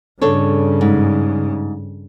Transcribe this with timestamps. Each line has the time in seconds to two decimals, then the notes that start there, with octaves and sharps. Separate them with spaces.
0.21 G2 C#3 D4 A4 C#5
0.81 G#2